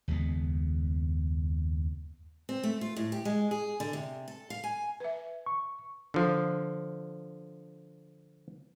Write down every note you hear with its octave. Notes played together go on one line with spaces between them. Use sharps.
F#1 D#2 G#3 B3
C4
A3
F4
A2
G4
G#3
G#4
D3
C3
A4
F5
G#5
B4 E5
C#6
D3 F3